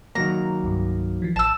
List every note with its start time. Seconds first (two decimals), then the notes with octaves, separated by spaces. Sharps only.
0.15 D#3 F#3 A#3 A#5
0.63 C2 G2
1.22 E3 F3
1.36 A1 A5 E6